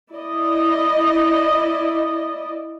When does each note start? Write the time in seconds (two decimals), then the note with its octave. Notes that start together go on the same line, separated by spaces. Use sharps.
0.12 E4 D5 D#5